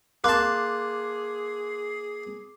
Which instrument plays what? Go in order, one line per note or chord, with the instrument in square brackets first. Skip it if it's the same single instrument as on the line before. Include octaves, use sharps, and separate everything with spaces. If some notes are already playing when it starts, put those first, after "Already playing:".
[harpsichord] A#3 A5 [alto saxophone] G#4 [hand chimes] C6 F#6 [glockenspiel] D6